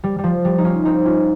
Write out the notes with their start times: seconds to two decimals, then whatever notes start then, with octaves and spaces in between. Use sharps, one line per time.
0.04 G3
0.19 G3
0.24 F3
0.45 G3
0.58 D#4
0.65 C#4 F4
0.85 C4 D#4
1.05 C#4 F4